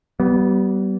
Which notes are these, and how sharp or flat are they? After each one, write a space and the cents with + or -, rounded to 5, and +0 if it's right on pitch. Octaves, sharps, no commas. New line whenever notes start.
G3 -30 B3 +0